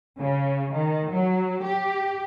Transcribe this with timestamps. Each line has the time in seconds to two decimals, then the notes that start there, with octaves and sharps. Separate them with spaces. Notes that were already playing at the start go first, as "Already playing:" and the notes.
0.19 C#3
0.73 D#3
1.11 F#3
1.63 G4